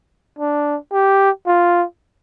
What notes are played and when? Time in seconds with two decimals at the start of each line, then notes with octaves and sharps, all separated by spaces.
0.39 D4
0.93 G4
1.46 F4